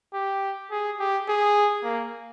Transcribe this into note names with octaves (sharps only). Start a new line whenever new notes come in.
G4
G#4
G4
G#4
A#3